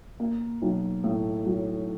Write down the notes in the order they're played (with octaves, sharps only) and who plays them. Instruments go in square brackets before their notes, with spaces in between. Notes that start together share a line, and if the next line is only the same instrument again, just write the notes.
[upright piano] A#3
B1
A2
F#3